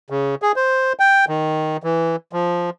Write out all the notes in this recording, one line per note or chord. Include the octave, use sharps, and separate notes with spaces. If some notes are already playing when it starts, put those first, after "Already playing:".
C#3
G#4
C5
G5
D#3
E3
F3